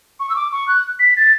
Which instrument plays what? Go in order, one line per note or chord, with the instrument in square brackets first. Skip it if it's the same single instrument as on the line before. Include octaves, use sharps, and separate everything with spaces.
[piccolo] C#6
E6
D6
C#6
F#6
B6
A6